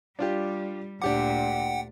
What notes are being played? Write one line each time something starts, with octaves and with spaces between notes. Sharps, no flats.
G3 D4 F4 G4
D2 A#2 D4 G4 F#5 G5 D6